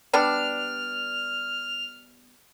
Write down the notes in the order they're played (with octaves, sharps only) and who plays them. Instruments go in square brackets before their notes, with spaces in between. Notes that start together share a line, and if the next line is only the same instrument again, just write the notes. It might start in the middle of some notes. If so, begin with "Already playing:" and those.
[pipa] G3 B3 D4 [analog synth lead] F6